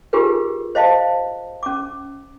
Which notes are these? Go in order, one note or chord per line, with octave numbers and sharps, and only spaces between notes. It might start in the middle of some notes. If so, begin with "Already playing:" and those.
D#4 F4 G4 G#4 A#4 B4
C5 D#5 F5 A5
C#4 D6